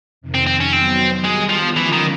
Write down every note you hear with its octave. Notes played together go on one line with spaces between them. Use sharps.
F2 C3 D#3
C4
C4
C#4
D#3 F#3 B3 C4
D#3 G3 G#3 B3
F3
D3 E3 F3 G#3 C#4 F4
D#3